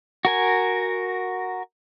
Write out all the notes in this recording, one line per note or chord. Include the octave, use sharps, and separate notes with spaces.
F#4 A#4 G#5